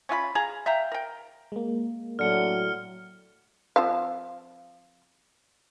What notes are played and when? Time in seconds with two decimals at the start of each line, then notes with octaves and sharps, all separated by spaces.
0.09 C#4 F4 F5 B5
0.35 G#4 F5 A#5
0.66 E5 F5 G5 A#5
0.92 A#4 G5
1.52 G#3 A#3
2.19 A2 D3 F#3 F6 C#7 G7
3.76 F3 C4 F5